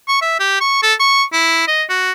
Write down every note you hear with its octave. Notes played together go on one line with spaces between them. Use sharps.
C#6
E5
G4
C#6
A4
C#6
E4
D#5
F#4